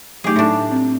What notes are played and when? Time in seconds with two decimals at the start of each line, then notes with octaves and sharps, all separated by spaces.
0.24 F#3 A3 D#4 G4 G#4
0.36 A2 D4
0.71 C4